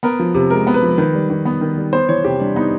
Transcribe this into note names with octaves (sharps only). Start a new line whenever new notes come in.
B3 A#4
F3
C3
G#3 A#4
B3
B4
F3
D#3 B4
G3
D#3
B3
D#3
G3
B3 C5
E3 C#5
C3 G4
G3 D4
B3 D#4